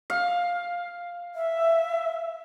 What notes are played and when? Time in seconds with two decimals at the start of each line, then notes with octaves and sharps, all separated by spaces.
0.10 F5
1.35 E5